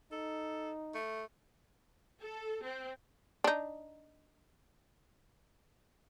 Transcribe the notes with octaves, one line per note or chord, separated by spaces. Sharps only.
D#4 A4
A3
A4
C4
D4 D#4